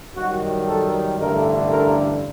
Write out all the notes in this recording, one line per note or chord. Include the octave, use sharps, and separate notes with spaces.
F#2 D#3 G3 F#4
A4
A1 G2 D3 A3 A#4
A#4